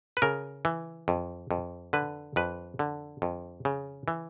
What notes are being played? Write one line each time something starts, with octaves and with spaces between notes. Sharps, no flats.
B4
C#3 A#4
E3
F2
F2
D3 B4
F2 B4
D3
F2
C#3
E3